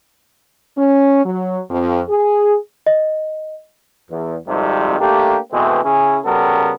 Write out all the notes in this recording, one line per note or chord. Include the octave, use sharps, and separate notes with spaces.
C#4
F#3
F2
G#4
D#5
E2
G#1 F2 C3 D#3 G3
A3 A#3 D4 G4
B2 E3 G#3 A3 C4
C#3 C#4 E4 G#4
C#3 G3 B3 F#4 A4 A#4